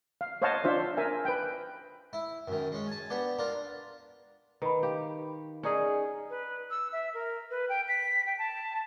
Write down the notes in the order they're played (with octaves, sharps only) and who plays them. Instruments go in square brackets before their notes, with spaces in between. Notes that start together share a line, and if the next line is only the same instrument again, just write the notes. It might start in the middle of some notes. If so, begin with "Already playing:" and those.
[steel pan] F5
C5 C#5 D#5 F5 F#5 A5
D4 F4 C5 E5
A#4 E5 G#5
B4 G5
[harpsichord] E4
F#2 D#3
G#3 C#4
G#5 A5
B3 D4 G4
D4 F4 A#4
[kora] D#3 [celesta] B4 B5
[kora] G4 [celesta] F5
[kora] C#4 D#4 G#4 [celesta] A#4 D5
[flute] B4
E6
E5
A#4
B4
G5
B6
G5
A5